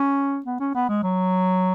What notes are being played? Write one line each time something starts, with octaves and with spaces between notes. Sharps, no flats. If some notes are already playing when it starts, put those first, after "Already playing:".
Already playing: C#4
B3
C#4
B3
G#3
F#3